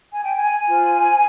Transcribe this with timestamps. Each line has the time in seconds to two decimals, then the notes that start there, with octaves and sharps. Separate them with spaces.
0.13 G#5
0.24 G5
0.36 G#5
0.67 F4 C5